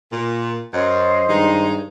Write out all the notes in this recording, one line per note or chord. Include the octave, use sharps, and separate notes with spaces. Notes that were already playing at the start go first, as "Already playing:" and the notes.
A#2
F#2 C5 D#5 F5
G2 D#3 G#3 D#4